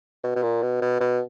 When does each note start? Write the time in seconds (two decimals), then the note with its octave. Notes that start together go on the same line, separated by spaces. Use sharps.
0.24 B2
0.36 B2
0.43 A#2
0.62 B2
0.82 B2
1.01 B2